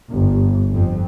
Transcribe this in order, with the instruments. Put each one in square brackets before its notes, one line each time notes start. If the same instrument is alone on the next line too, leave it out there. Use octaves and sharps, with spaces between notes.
[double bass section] G1
F2